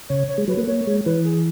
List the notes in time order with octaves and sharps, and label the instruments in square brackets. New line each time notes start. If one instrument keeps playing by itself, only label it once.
[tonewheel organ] C#3 [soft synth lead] C#5
[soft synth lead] C#5
[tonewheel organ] G#3
[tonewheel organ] F#3 [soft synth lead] B4
[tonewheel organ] A#3
[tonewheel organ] A#3 [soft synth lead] C#5
[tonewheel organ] G#3
[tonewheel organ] E3 [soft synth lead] B4
[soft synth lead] G#4